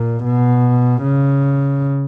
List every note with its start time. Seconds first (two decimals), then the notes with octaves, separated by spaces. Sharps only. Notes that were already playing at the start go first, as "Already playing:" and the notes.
Already playing: A#2
0.24 B2
1.03 C#3